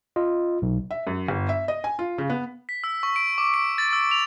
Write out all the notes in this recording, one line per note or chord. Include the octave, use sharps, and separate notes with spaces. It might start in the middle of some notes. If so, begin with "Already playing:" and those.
F4 D#5
B1
E5
F#2
G1
E5
D#5
G#5
F4
C#3
B3
B6
E6
C#6
D7
D6
D7
A6
E6
F7